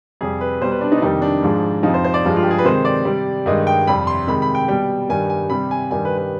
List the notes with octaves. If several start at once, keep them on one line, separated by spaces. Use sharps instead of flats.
F2 C3 G3 G#4
B4
B2 G3 C5
B4
D4
D#4
D4
F2 C3 D#3 G3 D#4
D4
G#2 F3 G#3
F2 C3 F3 D#4
C5
C5
D5
G2 F3 G#3
F4
G4
G#4
B4
C3 D#3 G#3 C5
D5
C3 G3
G2 D#3 G#3 D#5
G5
F2 C3 G3 B5
C6
C3 D#3 G#3 B5
B5
G5
B2 G3 G5
G2 D#3 G3 G#5
G#5
C3 G3 B5
G#5
G2 D#3 G3 G#5
B4
B4